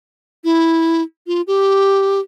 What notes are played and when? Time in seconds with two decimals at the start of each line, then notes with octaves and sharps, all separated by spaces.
0.44 E4
1.27 F4
1.47 G4